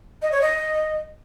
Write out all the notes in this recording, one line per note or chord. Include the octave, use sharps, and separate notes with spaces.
D#5
C#5
D#5